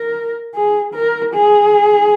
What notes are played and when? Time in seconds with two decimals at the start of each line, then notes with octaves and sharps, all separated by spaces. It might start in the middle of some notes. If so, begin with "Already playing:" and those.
Already playing: A#4
0.55 G#4
0.94 A#4
1.34 G#4